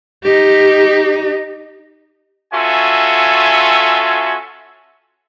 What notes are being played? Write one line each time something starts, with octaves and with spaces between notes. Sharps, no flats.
D#4 G4
C#4 F4 F#4 A4 E5 G#5